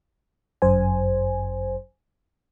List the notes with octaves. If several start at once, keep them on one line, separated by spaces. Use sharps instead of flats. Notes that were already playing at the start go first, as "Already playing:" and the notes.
G1 F#2 C5 G#5